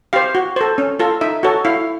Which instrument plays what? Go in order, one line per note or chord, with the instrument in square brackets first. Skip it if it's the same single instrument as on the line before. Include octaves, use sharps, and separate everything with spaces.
[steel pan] G4 C5 F5
F#4
A4 C5
C#4
F4 A4
D#4 E5
F#4 A4 C#5
E4 F5